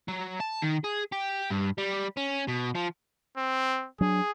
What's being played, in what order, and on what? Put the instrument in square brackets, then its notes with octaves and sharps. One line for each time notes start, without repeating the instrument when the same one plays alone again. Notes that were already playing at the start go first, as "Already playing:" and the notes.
[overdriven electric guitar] F#3
A5
D#3
G#4
G4
G2
G3
C#4
B2
F3
[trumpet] C4
[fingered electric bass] F#3 D4 [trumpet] G#4